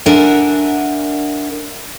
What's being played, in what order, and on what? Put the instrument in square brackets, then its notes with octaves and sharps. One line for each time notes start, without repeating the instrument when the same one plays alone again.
[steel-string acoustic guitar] D4 A#4 E5 F#5 G#5